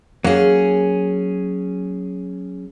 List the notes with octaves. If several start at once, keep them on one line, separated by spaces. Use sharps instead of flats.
F#3 A#3 C#4 G#4